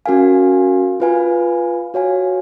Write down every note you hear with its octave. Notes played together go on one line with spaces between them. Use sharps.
C#4 F#4 A#4 F5 G#5
F4 B4 F5 G#5
F#4 C#5 F5 G#5